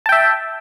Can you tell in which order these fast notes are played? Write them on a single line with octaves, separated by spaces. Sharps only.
A5 G5 E5